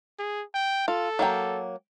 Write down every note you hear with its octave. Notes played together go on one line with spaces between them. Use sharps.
G#4
G5
F4 A4
F#3 A#3 G5